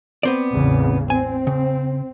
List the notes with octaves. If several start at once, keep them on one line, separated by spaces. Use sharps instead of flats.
B3 C4 D5
A1 E2 C#3
C4 G#5
C#3